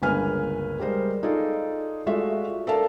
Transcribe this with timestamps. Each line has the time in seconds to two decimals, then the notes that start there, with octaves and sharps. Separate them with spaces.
0.02 G1 C#2 A#3 B4 G#5 F6
0.79 G3 G#3 A#4 C5
1.23 D#4 F4 G#4 A4 D5
2.06 G#3 A3 F4 F#4 D5 E5
2.67 A4 A#4 D5 E5 F5 A5